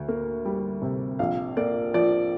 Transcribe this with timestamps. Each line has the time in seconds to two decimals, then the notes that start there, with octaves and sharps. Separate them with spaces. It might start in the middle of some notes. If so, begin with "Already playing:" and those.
Already playing: D2
0.08 A#3
0.45 G3
0.82 C3
1.19 A#1 F5
1.57 A#3 D5
1.94 F3 D5